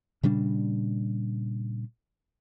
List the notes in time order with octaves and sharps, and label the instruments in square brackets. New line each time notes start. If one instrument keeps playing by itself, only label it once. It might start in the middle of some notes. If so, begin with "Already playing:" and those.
[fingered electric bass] A#2 C#3 G3 D4